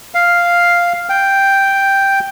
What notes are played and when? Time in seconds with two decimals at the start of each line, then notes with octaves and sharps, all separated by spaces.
0.14 F5
1.09 G5